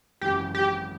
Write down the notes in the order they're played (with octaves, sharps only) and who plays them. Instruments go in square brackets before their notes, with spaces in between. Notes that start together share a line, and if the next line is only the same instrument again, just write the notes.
[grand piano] G#1 F#2 C#3 E3 [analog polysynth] G4
[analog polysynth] G4